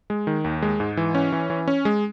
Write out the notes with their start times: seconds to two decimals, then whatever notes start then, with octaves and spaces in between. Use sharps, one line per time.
0.10 G#3
0.27 D#3
0.44 D#2
0.62 G#3
0.80 G#2
0.97 E3
1.15 C#4
1.32 E3
1.50 E3
1.68 C#4
1.85 G#3